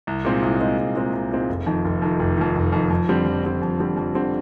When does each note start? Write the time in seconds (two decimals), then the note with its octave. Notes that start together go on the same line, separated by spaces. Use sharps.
0.07 C2
0.25 A#2 G#3 C4 D#4
0.42 C2
0.60 A#2 G#3 C4 D#4
0.78 C2
0.96 A#2 G#3 C4 D#4
1.13 C2
1.31 A#2 G#3 C4 D#4
1.49 F1
1.66 F2 D#3
1.85 F1
2.02 F2 D#3
2.19 F1
2.37 F2 D#3
2.55 F1
2.72 F2 D#3
2.90 F2
3.08 D3 G3 C4
3.26 F2
3.43 D3 G3 C4
3.62 F2
3.79 D3 G3 C4
3.96 F2
4.14 D3 G3 C4